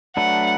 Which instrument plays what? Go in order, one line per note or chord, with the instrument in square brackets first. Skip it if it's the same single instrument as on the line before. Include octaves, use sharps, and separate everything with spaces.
[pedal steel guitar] F#3 A3 D4 B4 [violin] F#5